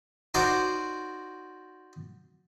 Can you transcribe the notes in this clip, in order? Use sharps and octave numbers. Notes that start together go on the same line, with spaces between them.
D#4 F#4 A#4 C5 D5